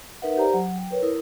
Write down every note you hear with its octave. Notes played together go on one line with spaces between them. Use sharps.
D#4 A#4 B4 E5 F#5
G4 C5 D5 A#5
F#3 F#5
G5
A#4 B4 C#5
E4 A#4 D#6